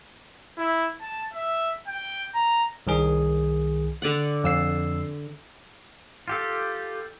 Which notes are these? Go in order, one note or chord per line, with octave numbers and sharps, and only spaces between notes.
E4
A5
E5
G5
A#5
C2 D#3 G#4
D3 D5 F#5
F2 E6 C7
F4 G4 A4